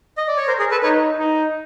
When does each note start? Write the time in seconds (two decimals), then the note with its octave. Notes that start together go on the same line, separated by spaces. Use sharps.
0.18 D#5
0.28 D5
0.37 C#5
0.47 A#4 C5
0.59 G#4 A#4
0.71 A4 B4
0.83 D#4 B4 C#5
1.19 D#4